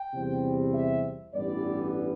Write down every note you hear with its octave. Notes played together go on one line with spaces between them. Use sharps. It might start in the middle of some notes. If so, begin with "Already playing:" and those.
Already playing: G5
E2 C3 G3 C4
E5
A1 G2 E3 G3 B3 D5